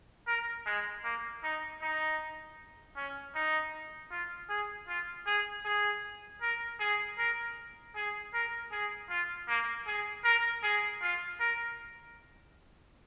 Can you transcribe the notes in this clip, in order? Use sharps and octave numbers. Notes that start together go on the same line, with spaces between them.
A#4
G#3
A#3
D#4
D#4
C#4
D#4
F4
G#4
F4
G#4
G#4
A#4
G#4
A#4
G#4
A#4
G#4
F4
A#3
G#4
A#4
G#4
F4
A#4